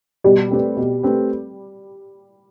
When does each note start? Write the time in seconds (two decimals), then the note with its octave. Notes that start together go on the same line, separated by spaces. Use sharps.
0.24 B2 G3
0.51 A3 C4 G4 B4
0.77 B2
1.03 A3 C4 G4 B4